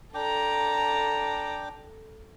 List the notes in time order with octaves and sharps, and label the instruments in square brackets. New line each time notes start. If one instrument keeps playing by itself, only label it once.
[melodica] D4 G5 D6 [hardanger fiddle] A4 A#5